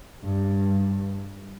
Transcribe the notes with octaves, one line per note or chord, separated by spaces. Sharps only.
G2